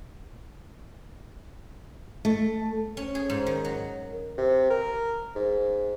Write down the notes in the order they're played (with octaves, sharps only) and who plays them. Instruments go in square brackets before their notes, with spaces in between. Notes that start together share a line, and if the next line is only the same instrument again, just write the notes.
[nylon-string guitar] A3
[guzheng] C#4
G#4
G#2
D#3
F#3
[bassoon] C3
A#4
G#2